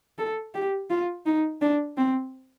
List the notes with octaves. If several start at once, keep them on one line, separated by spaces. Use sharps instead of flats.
A4
G4
F4
D#4
D4
C4